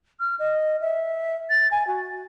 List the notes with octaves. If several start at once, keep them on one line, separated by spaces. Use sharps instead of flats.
F6
D#5
E5
A6
G#5
F#4